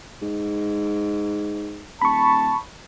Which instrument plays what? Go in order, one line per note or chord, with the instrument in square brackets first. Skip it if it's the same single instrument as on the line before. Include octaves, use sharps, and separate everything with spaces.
[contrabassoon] G#2
[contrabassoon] D#1 [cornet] A5 [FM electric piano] B5 C#6